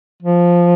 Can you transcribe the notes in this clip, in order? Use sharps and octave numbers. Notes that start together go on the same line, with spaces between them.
F3